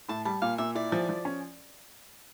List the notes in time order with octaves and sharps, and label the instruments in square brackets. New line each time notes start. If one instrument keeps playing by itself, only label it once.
[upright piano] A2 [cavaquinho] A5
[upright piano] G3 [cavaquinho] A5
[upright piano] A#2 [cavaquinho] F5
[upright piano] A#2 [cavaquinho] E5
[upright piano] E4 [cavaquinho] D5
[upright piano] F3
F3
C#4